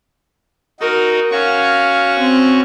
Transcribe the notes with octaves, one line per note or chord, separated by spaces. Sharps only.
D#4 F#4 A#4
C#4 F#4 F5 C#6
C4